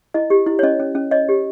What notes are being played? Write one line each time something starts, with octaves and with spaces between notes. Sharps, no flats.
E4 D#5
G4
E4
C#5
C#4 D#5
C#4
C#4
C#5 D#5
G4